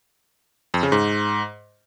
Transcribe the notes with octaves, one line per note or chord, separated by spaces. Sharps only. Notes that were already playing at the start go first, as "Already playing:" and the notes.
F2
C#3
G#2